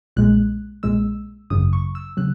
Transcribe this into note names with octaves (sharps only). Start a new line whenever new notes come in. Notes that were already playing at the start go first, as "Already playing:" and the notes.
B1 A#2 G#3 F#6
B1 A#2 G#3 E6
G#1 F#2 C#3 F#3 D#6
C#6
E6
C#3 F#3 F#6